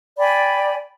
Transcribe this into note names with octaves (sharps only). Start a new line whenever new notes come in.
D5 G5 G#5 B5